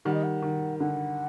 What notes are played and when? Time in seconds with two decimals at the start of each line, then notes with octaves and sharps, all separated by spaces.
0.05 D#3 G3 F#5
0.14 D#5
0.23 F#5
0.42 D#3
0.80 D3 F#5